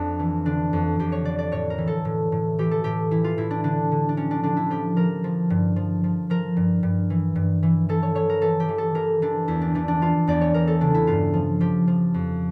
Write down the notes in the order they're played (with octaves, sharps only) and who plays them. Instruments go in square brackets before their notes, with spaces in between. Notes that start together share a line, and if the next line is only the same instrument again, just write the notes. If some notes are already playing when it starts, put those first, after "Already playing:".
Already playing: [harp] F2 D4
E3
D3 D4
F2
F2 G4
C#5
D3 D5
D5
A2 C#5
A#4
E3
A4
A2
A2
E3 G4
A4
A2 G4
E3 E4
F4
A2 E4
D4
D3 D4
D3
D4
F3 C#4
D4
D3 D4
E4
F3 G4
F3 A#4
F3
G2
F3
F3
F3 A#4
G2
G2
E3
G2
E3
E3 A4
C#5
E3 C#5
A#4
E3 A4
G4
E3
A4
E3 A#4
E3 D4
E2 E4
D4
E3 D4
D4
E3 F4
E2 D5
C#5
E2 A#4
A4
C#3 D4
E4
G2 F4
F3
F3 G4
F3
F2